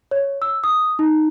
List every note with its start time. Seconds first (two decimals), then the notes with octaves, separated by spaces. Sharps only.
0.11 C#5
0.42 E6
0.64 D#6
0.99 D#4